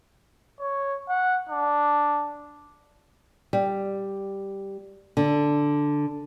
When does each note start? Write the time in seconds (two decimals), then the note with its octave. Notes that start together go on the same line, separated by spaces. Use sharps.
0.60 C#5
1.09 F#5
1.49 D4
3.53 G3
5.17 D3